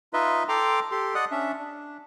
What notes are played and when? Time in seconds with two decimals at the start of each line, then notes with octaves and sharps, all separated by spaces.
0.13 D#4 F4 B4 D#5 E5
0.49 A4 G5 A#5 C6 D6
0.92 G4 A4 C6
1.15 D5 D#5 F#5 D#6 F#6
1.31 C#4 D4 E5
1.59 D4